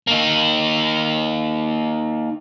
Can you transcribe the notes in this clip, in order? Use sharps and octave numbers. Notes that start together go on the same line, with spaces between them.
A#3 D#4